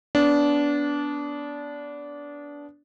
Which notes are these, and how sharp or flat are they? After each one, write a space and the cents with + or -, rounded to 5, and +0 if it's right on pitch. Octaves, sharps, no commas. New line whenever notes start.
B3 +0 D4 -20